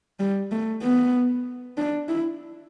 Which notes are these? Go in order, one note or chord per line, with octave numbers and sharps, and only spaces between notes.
G3
A3
B3
D4
E4